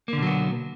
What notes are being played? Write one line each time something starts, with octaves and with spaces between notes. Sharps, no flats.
B2 D3 F#3 A#3 B3